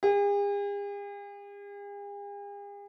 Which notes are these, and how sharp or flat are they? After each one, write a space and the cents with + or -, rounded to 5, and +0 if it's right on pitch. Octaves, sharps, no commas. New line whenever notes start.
G#4 -45